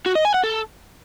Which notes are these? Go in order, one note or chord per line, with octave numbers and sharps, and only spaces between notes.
F#4
D#5
G#5
F#5
A4